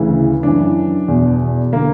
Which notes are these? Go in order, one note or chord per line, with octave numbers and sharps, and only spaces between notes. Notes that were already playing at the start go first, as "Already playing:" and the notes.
Already playing: D2 C#3 E3
F#2 E3 D4
E2 B2
D3 A#3